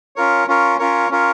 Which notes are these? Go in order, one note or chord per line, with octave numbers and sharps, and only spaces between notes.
C#4 F4 A#4 C#5
C#4 F4 A#4 C#5
C#4 F4 A#4 C#5
C#4 F4 A#4 C#5